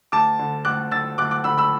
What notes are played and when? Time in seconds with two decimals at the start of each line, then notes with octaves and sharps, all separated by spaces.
0.12 D2 A5 D6
0.39 D3
0.65 D2 D6 F#6
0.91 D3 E6 A6
1.18 D2 D6 F#6
1.31 D6 F#6
1.44 D3 B5 E6
1.58 B5 E6